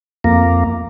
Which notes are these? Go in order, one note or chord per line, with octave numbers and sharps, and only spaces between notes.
F2 A#3